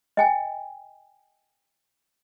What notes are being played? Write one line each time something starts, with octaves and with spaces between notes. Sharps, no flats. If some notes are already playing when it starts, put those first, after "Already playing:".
D#5 G5 G#5